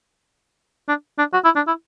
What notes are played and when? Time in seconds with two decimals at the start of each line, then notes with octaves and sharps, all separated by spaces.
0.88 D4
1.18 D4
1.33 F#4
1.44 E4
1.56 D4
1.67 E4